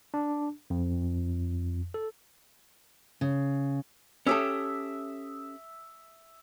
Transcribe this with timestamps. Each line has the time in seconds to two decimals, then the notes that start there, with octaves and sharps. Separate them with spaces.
0.14 D4
0.70 F2
1.94 A4
3.21 C#3
4.27 C#4 G4 A4 E5 D#6